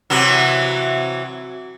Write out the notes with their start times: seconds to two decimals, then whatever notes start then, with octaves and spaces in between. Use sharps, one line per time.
0.10 C3 E3 F#3